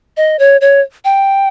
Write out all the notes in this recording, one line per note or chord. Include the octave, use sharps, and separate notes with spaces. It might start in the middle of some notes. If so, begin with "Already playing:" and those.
D#5
C#5
C#5
G5